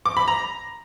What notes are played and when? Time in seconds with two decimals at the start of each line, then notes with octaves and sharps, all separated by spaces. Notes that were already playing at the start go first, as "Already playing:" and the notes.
0.06 D6
0.17 B5
0.28 A#5